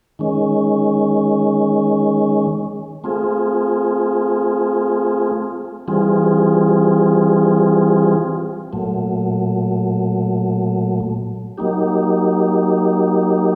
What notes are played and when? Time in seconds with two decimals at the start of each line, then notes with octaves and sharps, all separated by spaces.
0.19 D#3 G#3 C#4
3.04 A3 C4 F4 G#4
5.88 E3 G3 C4 F4 G#4
8.73 A#2 F#3 A3
11.58 F#3 A#3 D#4 G4